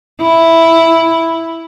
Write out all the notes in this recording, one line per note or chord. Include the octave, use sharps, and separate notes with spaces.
E4